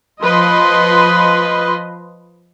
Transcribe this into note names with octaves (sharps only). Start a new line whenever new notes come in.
F3 B4 D#5 C6